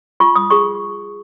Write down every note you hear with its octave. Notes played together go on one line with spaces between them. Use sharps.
F4 C#6
D#6
G#4 C#6